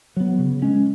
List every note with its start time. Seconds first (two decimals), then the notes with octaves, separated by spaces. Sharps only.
0.16 F#3 B3
0.39 C#3
0.62 G#3 C#4